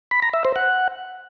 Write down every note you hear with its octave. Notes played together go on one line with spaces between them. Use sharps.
B5
A#5
E5
C5
F#5